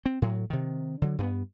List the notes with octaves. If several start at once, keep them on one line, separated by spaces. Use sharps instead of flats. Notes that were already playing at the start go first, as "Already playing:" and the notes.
C4
A2 F#3
C3 D#3
D3 F#3
G2 A3 B3